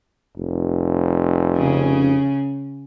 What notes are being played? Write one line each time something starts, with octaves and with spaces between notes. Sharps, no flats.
F1
C#3 C#4